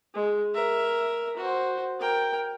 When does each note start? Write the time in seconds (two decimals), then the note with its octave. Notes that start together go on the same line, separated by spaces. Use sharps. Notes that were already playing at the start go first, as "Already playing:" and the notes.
0.14 G#3
0.54 A#4 E5
1.37 F#4 C5
2.00 A#4 G5